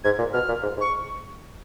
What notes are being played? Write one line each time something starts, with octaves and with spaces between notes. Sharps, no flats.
G#2 G#6
A#2
B2 F6
A#2
G#2
G#2
C#6